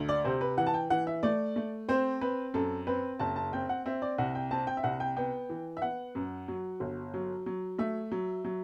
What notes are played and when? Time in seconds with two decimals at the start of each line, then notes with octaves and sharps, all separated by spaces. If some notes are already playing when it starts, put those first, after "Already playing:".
Already playing: D2
0.09 D5
0.24 C3 C5
0.41 B4
0.58 E3 F#5
0.66 A5
0.74 G5
0.90 E3 F#5
1.07 E5
1.23 A3 D5
1.56 A3
1.89 C4 C5
2.21 C4 B4
2.54 F#2 A4
2.87 C4 B4
3.19 F#1 A5
3.36 A5
3.53 C4 G5
3.69 F#5
3.86 C4 E5
4.02 D5
4.18 C2 F#5
4.35 G5
4.51 C4 A5
4.67 G5
4.77 E5
4.84 C2 F#5
5.00 G5
5.17 B3 G5
5.49 E3
5.77 E5
5.82 B3 F#5
6.15 F#2
6.48 F#3
6.80 G1
7.14 F#3
7.46 F#3
7.78 A3 E5
8.12 F#3
8.45 F#3